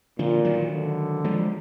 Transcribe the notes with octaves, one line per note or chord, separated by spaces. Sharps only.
A#2 D3 F3
D#3 F#3
D3
F3 G#3